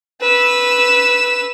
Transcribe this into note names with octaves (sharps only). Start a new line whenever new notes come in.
B4 E6